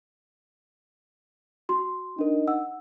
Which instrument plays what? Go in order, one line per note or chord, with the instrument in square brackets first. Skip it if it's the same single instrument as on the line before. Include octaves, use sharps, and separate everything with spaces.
[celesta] F#4 C6
[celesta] D4 A#4 [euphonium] D#4
[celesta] F#5 E6